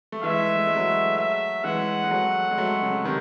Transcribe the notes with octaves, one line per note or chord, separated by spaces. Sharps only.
A3
E3 G#3 E5
A3
G#3
F#3 A3
E5
E3 G#3 F#5
G#3
F#3 A3
G#3
F#3 A3
C#3
C3 D#3